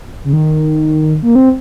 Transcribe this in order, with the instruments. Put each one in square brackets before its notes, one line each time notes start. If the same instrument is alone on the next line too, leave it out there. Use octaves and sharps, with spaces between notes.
[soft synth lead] C#3
D#3
A#3
C4